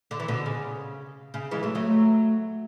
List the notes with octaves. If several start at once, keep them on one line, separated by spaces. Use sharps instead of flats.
D3
E3
B2 D3
C#3
C#3
E3 G#3
F#3 A3
F#3 A3